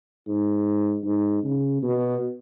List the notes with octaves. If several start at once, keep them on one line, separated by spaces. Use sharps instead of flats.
G#2
G#2
C#3
B2